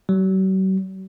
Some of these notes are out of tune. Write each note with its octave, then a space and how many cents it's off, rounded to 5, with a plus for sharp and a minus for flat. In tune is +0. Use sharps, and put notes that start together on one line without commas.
F#3 +45